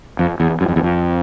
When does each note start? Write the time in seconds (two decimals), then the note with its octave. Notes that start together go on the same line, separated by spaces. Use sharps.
0.19 F2
0.40 E2
0.61 F#2
0.68 F2
0.76 E2
0.83 F2